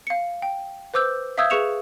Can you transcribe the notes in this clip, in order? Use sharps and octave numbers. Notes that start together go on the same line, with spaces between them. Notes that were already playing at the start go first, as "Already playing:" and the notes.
F5 C#7
G5
B4 C5 D6 E6 G6
E5 F5 D#6 E6 G6 G#6
G#4 B4 C#6 C#7 E7 F7